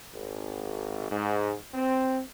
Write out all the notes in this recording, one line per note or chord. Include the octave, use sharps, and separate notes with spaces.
G#1
G#2
C4